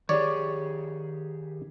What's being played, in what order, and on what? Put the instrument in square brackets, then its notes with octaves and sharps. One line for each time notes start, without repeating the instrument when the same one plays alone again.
[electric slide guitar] D#3 G4 G#4 [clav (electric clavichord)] C#5 D5